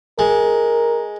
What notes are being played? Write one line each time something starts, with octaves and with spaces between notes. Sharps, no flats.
G#3 A#4